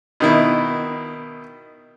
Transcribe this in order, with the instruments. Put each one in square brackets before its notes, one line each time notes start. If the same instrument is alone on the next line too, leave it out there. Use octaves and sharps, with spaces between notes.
[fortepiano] B2 D#3 E4